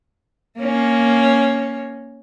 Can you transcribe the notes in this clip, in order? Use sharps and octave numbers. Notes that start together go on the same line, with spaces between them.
A#3 C#4